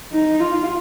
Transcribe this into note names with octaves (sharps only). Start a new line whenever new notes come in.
D#4
F4